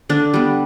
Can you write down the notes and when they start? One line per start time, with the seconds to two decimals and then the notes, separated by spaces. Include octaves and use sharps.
0.09 D3 D4
0.34 G3 B3